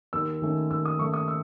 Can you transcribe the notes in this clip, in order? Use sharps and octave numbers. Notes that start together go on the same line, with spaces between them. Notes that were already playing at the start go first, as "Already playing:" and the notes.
D#2 E6
D#3 A3 C#4
D#2 E6
D#6
D#3 A3 C#4 C#6
D#6
E6